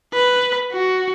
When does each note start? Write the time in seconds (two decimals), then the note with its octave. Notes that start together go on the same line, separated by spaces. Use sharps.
0.14 B4
0.72 F#4